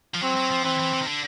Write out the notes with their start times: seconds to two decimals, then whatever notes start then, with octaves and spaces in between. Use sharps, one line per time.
0.15 F3
0.22 F#3 C4
0.37 F#3
0.51 F3
0.65 E3 C4
0.80 E3
0.93 E3
1.02 D#3
1.07 D3